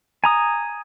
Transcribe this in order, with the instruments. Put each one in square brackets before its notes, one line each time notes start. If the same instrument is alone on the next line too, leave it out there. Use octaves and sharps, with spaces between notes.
[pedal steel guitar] G#5 A#5 D#6